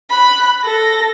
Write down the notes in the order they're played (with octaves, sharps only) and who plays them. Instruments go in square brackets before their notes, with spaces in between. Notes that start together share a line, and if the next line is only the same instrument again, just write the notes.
[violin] B5 F#6
A4 A#6